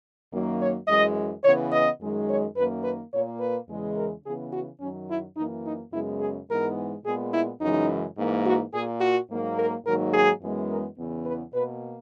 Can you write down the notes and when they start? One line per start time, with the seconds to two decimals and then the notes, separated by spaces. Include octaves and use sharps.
0.32 F#2 D#3 F#3 A#3
0.60 C#5
0.88 F#2 E3 G#3 D#5
1.44 C#3 E3 B3 C#5
1.73 D#5
2.00 F#2 D#3 G#3
2.28 C#5
2.56 F#2 D#3 A#3 B4
2.84 B4
3.13 A#2 A#3 C#5
3.40 B4
3.68 E2 C#3 E3 G#3
3.96 A#4
4.25 C#3 E3 B3 G#4
4.53 F#4
4.81 F#2 D#3 F#3 C#4
5.09 E4
5.37 F#2 E3 A#3 D#4
5.65 D#4
5.92 F#2 C#3 G#3 B3 E4
6.21 G#4
6.48 G#2 E3 G#3 B3 A#4
7.05 A#2 G#3 B3 G#4
7.34 E4
7.61 F#2 C#3 E3 G#3 D#4
8.17 G#2 E3 A#3
8.45 F#4
8.73 A#2 A#3 G#4
9.01 F#4
9.29 G#2 F#3 A#3
9.57 A#4
9.86 G#2 D#3 F#3 A#3 A#4
10.14 G#4
10.41 F#2 E3 G#3 B3
10.69 A#4
10.97 E2 C#3 E3 B3
11.26 B4
11.54 B2 A#3 B4